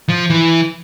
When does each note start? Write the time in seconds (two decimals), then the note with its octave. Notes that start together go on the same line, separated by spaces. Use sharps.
0.09 F3
0.30 E3